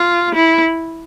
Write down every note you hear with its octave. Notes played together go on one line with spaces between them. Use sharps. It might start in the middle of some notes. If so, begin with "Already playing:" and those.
Already playing: F4
E4